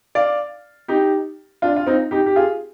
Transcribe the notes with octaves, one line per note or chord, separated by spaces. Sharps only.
D5 F5
D#4 G4
D4 F4
F4
C4 D#4
D#4 G4
G4
F4 G#4